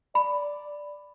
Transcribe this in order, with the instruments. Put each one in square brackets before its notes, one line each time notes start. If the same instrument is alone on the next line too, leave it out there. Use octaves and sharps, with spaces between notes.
[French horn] D5 [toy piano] B5